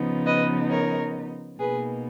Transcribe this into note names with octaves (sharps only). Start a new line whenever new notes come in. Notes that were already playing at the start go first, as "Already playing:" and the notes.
Already playing: C#3 F3 B3 D#4
B4 D#5
A#4 C#5
B2 A#3 D#4 G#4 B4